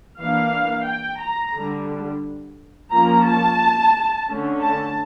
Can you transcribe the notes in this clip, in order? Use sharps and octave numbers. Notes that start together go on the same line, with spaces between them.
E3 A#3 D4 F5
G5
A#5
D3 G3 D4
F3 A#3 C#4 A#5
A5
D3 A3 C#4
A5